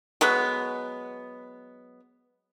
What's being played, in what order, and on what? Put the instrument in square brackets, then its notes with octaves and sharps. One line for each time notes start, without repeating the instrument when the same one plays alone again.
[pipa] F#3 G#3 B3